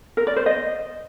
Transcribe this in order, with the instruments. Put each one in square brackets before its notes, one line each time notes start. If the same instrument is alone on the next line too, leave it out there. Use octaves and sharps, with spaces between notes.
[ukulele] A#4
D5
C5
D#5